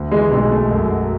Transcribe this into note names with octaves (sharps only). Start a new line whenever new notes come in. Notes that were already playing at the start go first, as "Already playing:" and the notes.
Already playing: D2
E3 G#3
B1 G#3
A3
F#2
F#3